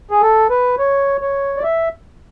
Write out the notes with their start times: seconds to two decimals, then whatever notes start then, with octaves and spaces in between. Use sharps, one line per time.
0.11 G#4
0.22 A4
0.50 B4
0.79 C#5
1.21 C#5
1.56 D5
1.63 E5